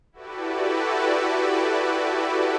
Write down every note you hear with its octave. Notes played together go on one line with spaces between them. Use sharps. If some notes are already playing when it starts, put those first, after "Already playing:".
E4 F#4 G4 A4 B4 D5